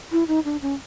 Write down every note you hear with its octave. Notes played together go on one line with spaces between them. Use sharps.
E4
D#4
D4
C#4